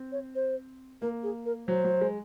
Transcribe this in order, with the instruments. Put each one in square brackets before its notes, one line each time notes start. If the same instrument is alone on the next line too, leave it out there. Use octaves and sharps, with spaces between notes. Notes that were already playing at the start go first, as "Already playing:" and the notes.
Already playing: [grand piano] C4
[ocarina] C#5
C5
[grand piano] A#3 [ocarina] A#4
[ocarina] G#4
A#4
[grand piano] F#3 [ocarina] C5
[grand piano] F#3
G#3